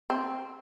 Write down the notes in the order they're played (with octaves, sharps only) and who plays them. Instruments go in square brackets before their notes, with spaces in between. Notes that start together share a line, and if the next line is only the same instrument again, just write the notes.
[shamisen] C4